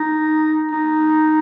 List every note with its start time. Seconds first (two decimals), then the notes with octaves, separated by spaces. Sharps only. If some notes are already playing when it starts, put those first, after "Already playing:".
Already playing: D#4
0.71 D#4